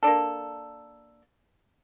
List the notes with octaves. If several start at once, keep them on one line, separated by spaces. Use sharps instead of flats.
A#3 D4 A4